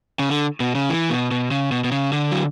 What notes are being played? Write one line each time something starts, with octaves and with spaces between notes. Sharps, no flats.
C#3
D3
B2
C#3
E3
B2
B2
C#3
B2
B2
C#3
D3
F#3